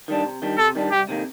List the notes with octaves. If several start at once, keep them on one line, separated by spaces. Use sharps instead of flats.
D#3 G3 D4
C3
D#3 G3 D4
C3 A4
D#3 G3 D4
C2 G4
C3 D#3 A#3